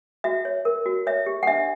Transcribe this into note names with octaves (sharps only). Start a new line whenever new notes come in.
F#4 E5
C#5
A#4
F#4
C#5 E5
G4
F#5
D4 E5